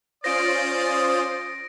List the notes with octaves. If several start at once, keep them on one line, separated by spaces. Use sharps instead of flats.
C#4 F4 C5 D5 D#6 A#6 D7